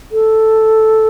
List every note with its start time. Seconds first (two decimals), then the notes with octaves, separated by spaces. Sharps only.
0.12 A4